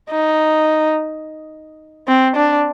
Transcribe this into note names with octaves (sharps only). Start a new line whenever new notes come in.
D#4
C4
D4